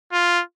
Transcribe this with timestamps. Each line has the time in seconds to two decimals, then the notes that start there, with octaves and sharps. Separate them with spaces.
0.13 F4